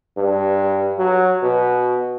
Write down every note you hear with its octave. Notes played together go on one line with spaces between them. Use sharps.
G2
F#3
B2